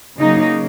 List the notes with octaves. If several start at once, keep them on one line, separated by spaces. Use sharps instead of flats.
C#3 F#3 A#3 D#4